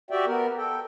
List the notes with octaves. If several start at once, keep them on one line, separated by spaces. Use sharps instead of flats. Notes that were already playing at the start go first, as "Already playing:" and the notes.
F#4 G4 D5 E5 G5
B3 A#4
A4 G5